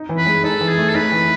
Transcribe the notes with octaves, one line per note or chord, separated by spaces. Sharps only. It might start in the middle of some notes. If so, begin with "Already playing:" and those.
Already playing: D#4
E3
B4
G#3
D#4 A4
E3
G#4
A3
A4
D#4 B4
E3